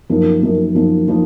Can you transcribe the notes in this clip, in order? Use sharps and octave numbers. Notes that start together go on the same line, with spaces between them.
F#2 F3 A#3 D#4 A#4
F#2 F3 A#3 D#4
F#2 F3 A#3 D#4
F3 A#3 D#4